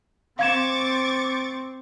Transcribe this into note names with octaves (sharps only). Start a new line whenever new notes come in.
C4 F5 C#6 D6 G#6 A6 E7